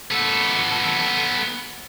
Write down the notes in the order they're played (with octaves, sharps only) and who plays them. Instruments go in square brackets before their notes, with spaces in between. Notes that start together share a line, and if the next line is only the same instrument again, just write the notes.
[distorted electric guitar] B3 A4